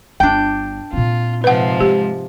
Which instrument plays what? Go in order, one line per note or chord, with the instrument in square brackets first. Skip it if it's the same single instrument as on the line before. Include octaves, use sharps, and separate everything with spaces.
[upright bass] G1 F4 [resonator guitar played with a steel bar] D4 G5
[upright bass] A#2 C4 [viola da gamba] F4
[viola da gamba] G#2 C3 F3 [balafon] B4 F#5
[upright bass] G#3 [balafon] G4